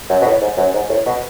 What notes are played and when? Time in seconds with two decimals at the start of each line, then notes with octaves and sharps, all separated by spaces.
0.10 F#2
0.22 B2
0.26 A2
0.41 G#2
0.57 F#2
0.74 G#2
0.90 A2
1.06 B2